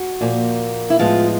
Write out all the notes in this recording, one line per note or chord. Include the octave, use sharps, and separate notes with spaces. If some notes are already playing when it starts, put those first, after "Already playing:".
Already playing: F#4
A#2 F3 A#3
E4
A2 F3 G#3 B3 F4